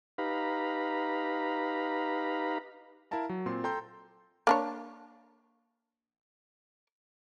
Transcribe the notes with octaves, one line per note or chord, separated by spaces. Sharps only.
D#4 G4 B4 F5 A#5 B5
E4 A#4 F5 A5 A#5
F#3
A#2 C4 C6
A4 G5 A#5 C6 G6
A#3 D4 C#5